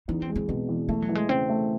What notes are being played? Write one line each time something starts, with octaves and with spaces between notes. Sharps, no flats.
E2 D#4
C4
G#3
C4
B2 C4
E2
A3 A#3
F#3
E3
G#3
C#3 C4
A3